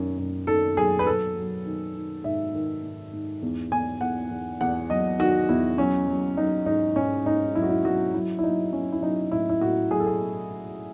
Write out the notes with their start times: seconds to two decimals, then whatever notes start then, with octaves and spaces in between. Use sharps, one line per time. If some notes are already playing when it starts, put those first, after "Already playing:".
Already playing: F#2 D#3
0.18 F#2
0.47 D#3 A4
0.77 F#3 G#4
0.99 B4
1.06 F#3 A4
1.37 F#3
1.66 D#3
1.94 D#3
2.24 G#2 E5
2.54 D#3
2.83 G#2
3.13 G#2
3.42 E2
3.71 E2 G#5
4.01 E2 F#5
4.31 E2
4.61 E2 F#5
4.90 F#3 D#5
5.19 D#3 F#4
5.49 E2 E4
5.78 F#3 C#4
6.08 F#3
6.37 F#3 D#4
6.66 G#2 D#4
6.96 G#2 C#4
7.26 G#2 D#4
7.55 F#3 E4
7.62 F#4
7.69 E4
7.85 F#3 F#4
8.14 F#3 E4
8.39 E4
8.43 F#3 D#4
8.73 F#3 C#4
8.92 E4
9.03 F#3 D#4
9.32 A2 E4
9.49 E4
9.61 A2 F#4
9.91 F#3 G#4
10.00 A4
10.06 G#4